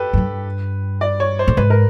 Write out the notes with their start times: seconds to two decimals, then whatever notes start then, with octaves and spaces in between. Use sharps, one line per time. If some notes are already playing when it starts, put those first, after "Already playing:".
Already playing: G4 A4 B4
0.13 F#2
0.17 G2
1.01 D5
1.20 C#5
1.39 C5
1.48 A2
1.57 G#2 B4
1.70 A#4